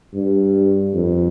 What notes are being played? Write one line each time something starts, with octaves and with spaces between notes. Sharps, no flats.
G2
F2